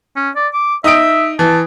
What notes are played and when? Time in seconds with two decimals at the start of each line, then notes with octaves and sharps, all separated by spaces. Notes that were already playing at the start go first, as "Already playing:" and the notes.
0.16 C#4
0.36 D5
0.54 D6
0.84 D#4 E5 D#6 D7
1.39 E3 A5